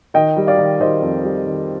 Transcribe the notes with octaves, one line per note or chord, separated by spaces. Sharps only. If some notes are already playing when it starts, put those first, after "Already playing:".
D#3 D#5 G5
G3
D5 F5
D#3
D#3 C5 D#5
F2
G3
D#3